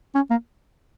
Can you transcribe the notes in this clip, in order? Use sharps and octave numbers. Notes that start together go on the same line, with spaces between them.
C#4
A#3